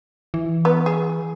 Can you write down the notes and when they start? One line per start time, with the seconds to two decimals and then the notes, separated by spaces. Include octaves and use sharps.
0.34 E3
0.65 B3
0.86 G#4